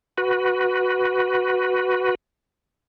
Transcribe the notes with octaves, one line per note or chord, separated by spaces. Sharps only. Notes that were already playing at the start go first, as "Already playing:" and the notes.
F#4 B4